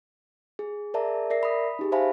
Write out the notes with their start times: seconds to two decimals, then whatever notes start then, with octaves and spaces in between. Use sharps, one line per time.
0.59 G#4
0.94 G#4 A#4 D5 E5 A5 A#5
1.30 A#4 D5 E5 A#6 C7
1.43 B5 D#6
1.79 D#4 G4 G#4
1.92 C5 E5 F5 G#5 A5 B5